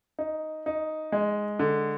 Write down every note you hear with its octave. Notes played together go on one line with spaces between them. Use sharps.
D#4
D#4
G#3
D3